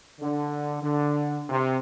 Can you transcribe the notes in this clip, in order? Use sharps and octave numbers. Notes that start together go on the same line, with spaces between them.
D3
D3
C3